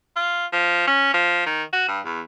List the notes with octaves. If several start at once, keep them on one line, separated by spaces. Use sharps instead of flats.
F4
F3
C#4
F3
D#3
F#4
G2
E2